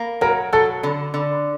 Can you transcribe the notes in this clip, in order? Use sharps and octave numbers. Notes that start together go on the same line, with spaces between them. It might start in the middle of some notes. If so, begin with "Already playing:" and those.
Already playing: A#3
F#3 A#4
F#3 A4
D3
D3